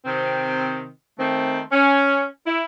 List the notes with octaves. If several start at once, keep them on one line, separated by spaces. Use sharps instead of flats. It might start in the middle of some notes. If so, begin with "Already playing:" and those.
C3 D#3 C4
D#3 A3 C4
C#4
E4